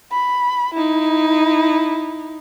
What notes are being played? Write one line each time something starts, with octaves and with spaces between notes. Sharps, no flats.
B5
D#4 E4